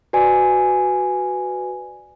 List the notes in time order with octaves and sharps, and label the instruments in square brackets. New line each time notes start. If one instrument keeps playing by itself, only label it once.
[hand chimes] F#4 B4 D5 G#5